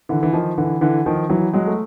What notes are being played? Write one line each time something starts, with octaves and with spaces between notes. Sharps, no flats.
D3 E3
E3
D#3 F3
D3 E3
D3 E3
D#3 F3
E3 F#3
F#3 G#3
A3